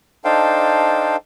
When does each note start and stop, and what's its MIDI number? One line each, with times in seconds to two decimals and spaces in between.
0.25 1.16 62
0.25 1.16 63
0.25 1.16 69
0.25 1.16 72
0.25 1.16 77
0.25 1.16 79